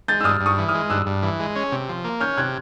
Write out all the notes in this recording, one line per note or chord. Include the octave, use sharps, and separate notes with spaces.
G#3 G6 A6
E6
G2 D#6 F6
G2
C#6 D#6
E3
D#6 F6
G#3
G2 E6 F#6
G2
E3
G#3
C#4
C3
F3
A#3
C#4 F6 G6
C3 F#6 G#6